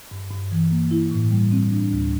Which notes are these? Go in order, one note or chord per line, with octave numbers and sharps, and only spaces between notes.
G2
G2
E3
A#3
E4
A2
G3
C4
D4
D2